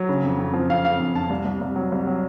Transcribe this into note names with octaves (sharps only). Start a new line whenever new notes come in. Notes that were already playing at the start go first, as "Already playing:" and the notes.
Already playing: F#3
C#3
F2
F2
F3
F2 F5
F2 F5
F2
F2 A5
C2
C2
C2
F#3
C2
F#3